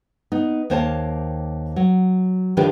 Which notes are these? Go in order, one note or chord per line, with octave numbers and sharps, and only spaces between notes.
B3 D#4
D#2 A#3 C5 C#5 F5 A5
F#3
D3 D#3 F3 D4 G4 B4